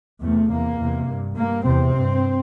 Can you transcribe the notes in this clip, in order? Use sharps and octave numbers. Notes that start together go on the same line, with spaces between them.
E2 C3 A3
E2 C3 A#3
E2 C3
G2
G2 A#3
E2 C3 C4
G2